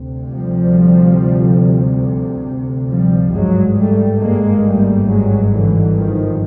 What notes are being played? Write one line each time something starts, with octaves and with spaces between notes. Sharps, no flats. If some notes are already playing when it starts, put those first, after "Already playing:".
Already playing: D2 C3
F3 G3
F3 G3
G#1 G2 F#3 G#3
G3 A3
G#3 A#3
G3 A3
F#3 G#3
D3 E3
D#3 F3